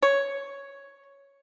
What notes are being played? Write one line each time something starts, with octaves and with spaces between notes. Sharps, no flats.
C#5